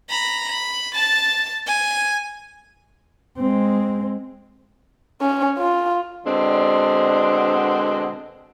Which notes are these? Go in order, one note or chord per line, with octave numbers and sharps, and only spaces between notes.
A#5 B5
B5
A5 A6
G#5
G#3 C4
C#4
F4
B2 D3 G#3 C4 D4